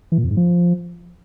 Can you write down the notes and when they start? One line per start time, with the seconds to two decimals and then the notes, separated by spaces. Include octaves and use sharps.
0.12 E3
0.18 A#2
0.24 F2
0.31 G#2
0.37 F3